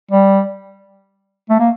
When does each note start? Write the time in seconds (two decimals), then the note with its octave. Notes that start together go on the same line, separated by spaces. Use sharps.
0.12 G3
1.50 A3
1.60 A#3